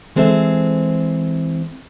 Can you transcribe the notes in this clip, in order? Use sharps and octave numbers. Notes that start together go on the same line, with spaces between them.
E3 G#3 C4 A4 C5 E5